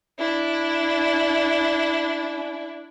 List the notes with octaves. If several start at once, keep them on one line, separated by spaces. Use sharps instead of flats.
D4 E4